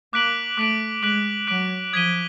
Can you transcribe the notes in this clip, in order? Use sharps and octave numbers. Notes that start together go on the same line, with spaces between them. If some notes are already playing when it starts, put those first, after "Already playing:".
A#3 D6 F#6 B6 D7 F#7
A3 D6 F#6 B6 D7 F#7
G#3 D6 F#6 B6 D7 F#7
F#3 D6 F#6 B6 D7 F#7
F3 D#6 G#6 B6 D#7 G7